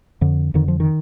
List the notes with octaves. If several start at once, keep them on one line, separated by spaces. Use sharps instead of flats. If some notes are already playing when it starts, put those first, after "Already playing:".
F2 D3
F2 D3 D#3
F3
D#3